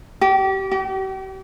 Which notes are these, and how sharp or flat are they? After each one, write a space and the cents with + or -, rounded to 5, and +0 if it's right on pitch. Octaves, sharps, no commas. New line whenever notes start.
G4 -30
G4 -40